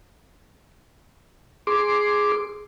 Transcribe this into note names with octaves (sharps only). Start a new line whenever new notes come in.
G#4 C6 D6